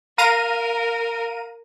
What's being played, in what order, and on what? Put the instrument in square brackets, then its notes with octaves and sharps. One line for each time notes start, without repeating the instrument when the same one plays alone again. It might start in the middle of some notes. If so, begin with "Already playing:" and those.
[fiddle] A#4 [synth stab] F5 A#5 D#7